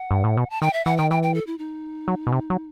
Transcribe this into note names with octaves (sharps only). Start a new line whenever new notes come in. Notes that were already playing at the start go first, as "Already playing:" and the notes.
Already playing: F#5
G2
A2
B2
A5
D#3 G5
E5
E3 F#5
D#3 G5
E3 G5
G5
A4
E4
D#4
F#3
B2
C3
F#3